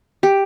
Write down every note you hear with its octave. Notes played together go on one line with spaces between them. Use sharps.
G4